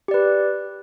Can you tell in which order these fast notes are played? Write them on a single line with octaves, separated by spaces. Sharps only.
G4 D5 B4